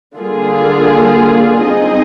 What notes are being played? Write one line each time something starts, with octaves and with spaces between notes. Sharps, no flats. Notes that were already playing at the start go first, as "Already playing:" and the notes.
D3 G3 A#3 F4 G#4
G3 C4 D#4 G#4 D#5